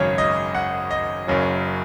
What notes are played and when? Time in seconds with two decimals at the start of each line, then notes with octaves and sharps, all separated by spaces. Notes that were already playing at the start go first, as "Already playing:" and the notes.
Already playing: G#1 F#2 C#3 F#3 C#5
0.18 D#5
0.55 F#5
0.91 D#5
1.27 F#1 F#2 C#3 F#3